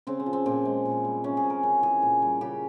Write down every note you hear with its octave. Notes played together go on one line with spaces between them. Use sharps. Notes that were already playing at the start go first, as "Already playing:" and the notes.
C#3 C4
C4
F3
C4
A#2 C4
G#3
A#2
G3
C3 C#4
G#4
F3
A#4
C#3 A#4
E3 G#4
A#2
G3
C#3 G4